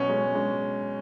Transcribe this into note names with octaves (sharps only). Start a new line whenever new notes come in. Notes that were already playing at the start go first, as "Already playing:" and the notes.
Already playing: B2 F#3 C#4
G#3
G#3